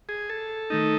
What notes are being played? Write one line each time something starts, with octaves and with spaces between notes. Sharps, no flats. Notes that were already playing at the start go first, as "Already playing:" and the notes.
G#4
A4
D#3 A3 D#4